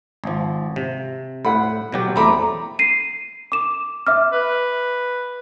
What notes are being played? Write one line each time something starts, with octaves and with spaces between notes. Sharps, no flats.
G#1 F3
C3
A2 F#5 B5
B2 F#3 G4
E2 A3 C4 A#5 B5 D6
C7 D#7
D6 E7
E5 D6 F6
B4